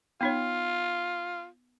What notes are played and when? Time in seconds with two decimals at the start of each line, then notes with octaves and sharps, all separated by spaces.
0.21 B3 D#4 F4 C#5